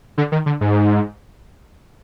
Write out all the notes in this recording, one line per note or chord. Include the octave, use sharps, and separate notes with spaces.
D3
D#3
D3
G#2